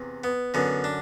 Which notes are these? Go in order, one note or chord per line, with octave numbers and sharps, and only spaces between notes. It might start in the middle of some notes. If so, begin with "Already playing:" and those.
Already playing: E2 C3
B3
F#2 D3 B3
D4